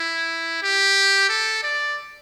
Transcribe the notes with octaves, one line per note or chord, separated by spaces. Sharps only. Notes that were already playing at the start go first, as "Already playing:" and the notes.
Already playing: E4
G4
A4
D5